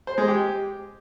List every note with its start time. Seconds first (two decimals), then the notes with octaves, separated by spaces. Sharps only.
0.07 C5
0.18 G#3
0.28 G4